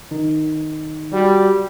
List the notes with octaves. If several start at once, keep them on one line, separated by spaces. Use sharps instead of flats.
D#3 D#4
G3 F#4